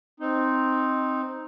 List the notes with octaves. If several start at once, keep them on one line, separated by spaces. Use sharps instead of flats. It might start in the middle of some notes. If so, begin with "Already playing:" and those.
C4 D#4